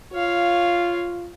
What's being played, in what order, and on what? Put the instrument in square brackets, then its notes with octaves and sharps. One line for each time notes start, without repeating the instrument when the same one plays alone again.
[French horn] F4 [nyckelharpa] C#5 F5